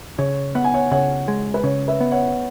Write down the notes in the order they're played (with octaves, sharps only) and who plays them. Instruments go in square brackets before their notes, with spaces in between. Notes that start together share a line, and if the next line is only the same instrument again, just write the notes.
[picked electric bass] C#3 [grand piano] C#5
[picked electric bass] B3 [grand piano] F#5
[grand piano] G#5
C#5 F#5
[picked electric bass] C#3 [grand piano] C#5 F#5
[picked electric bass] G#3
[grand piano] B4
[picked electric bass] C#3 [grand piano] C#5
[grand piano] B4 E5
[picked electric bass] B3
[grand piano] C#5 F#5